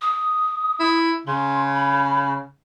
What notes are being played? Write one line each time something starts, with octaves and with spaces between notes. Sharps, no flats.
D#6
E4
C#3 C6
B5